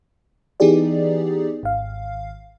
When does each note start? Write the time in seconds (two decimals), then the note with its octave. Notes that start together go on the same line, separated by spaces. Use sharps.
0.60 E3 B3 D#4 G4 G#4 D5
1.63 G#1 F5